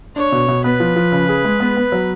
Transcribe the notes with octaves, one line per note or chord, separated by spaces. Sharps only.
D4 C#5
B2
B2
B3 B4
F3
F3
C#3
G#4
G#3
B3
B3
F#3